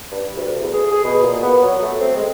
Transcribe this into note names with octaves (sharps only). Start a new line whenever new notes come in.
G2
D2
E2
G#4
G#4
B2
A#2
B3
F#3
A3
C4
G#3